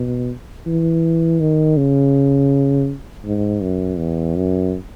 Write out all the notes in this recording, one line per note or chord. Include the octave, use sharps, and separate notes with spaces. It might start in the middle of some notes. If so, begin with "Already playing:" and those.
Already playing: B2
E3
D#3
C#3
G#2
F#2
E2
F#2